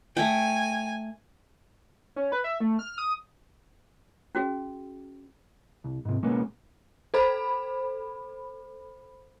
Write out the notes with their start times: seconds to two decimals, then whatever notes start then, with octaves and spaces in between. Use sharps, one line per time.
0.17 A3 G5 G#5
2.16 C#4
2.32 B4
2.44 E5
2.60 A3
2.79 F6
2.98 D#6
4.35 C#4 F#4 G#4
5.84 C2
6.05 G#2 C3
6.23 B2 G#3 A#3 B3 C#4
7.14 A4 C5 B5